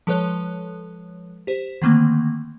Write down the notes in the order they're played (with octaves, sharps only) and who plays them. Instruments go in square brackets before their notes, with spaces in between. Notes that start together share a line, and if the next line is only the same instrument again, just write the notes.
[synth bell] F3 G#3 A4 B4 C#5 F#6
G4 C5
D3 D#3 A3 A#3 C4